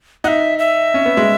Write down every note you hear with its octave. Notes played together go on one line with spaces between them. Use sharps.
D#4 E5 F#5
E5
C#4
B3
G#3